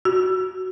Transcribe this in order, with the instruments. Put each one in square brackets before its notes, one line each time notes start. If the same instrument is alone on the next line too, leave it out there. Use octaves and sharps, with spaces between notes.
[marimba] F#4